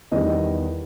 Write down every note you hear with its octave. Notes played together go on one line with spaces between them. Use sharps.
E2 D#3 G3 B3 D#5